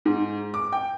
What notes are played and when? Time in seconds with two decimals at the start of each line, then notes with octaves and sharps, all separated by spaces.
0.06 G#2
0.54 D6
0.72 G5